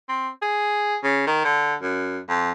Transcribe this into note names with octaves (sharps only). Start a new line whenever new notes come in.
C4
G#4
C#3
D#3
D3
F#2
F2